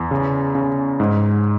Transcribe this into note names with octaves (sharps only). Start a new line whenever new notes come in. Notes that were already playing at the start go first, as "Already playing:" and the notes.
Already playing: E2
C#3
C#3
G#2